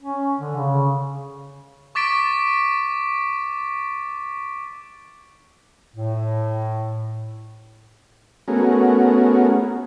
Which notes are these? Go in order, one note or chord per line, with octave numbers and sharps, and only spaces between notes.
C#4
D3
C#3
C#6 D6 A6 B6 D7
A2
A3 B3 C#4 F#4 G#4 A#4